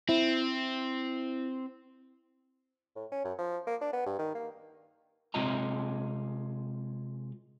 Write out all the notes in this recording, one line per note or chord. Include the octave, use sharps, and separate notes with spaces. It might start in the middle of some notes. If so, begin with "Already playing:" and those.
C4 E4
A2
C#4
F#2
F3
A#3
D4
B3
G2
D#3
A#3
C3 G#3 C4 F4 D#5 A#5